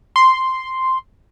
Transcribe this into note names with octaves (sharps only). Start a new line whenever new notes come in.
C6